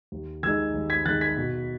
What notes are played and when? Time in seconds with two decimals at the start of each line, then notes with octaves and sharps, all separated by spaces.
0.12 D#2
0.43 D#3 G#3 D#4 E6 G#6
0.74 D#2
0.90 G#6 B6
1.05 D#3 G#3 D#4 F#6 A6
1.21 G#6 B6
1.37 B2